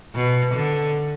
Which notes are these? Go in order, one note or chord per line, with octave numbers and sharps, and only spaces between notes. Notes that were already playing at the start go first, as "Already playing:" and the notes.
B2
D3